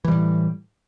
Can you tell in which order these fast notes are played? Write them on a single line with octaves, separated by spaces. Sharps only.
E3 G3 A2